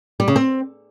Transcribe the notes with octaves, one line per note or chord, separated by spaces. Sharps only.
G3
C#3
C4